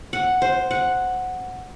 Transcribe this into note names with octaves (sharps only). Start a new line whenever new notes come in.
F#5
C5
F#5